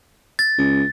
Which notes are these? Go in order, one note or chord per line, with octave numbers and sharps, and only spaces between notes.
A6
C#2